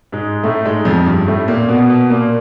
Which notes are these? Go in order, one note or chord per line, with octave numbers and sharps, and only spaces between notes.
G#2 G#3
A2 A3
G#2 G#3
F2 F3
G2 G3
A2 A3
A#2 A#3
B2 B3
B2 B3
A#2 A#3